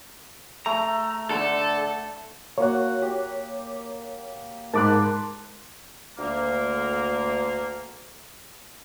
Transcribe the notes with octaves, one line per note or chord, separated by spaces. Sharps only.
A3 A#5
D3 A4
A#3 F#4 C#5 F#5
G4
G#2 A#4 A5 B5 C6 D6 F#6
D2 A#3